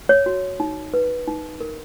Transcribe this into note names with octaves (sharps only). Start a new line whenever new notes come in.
C#5
F#4
D#4
B4
D#4
A#4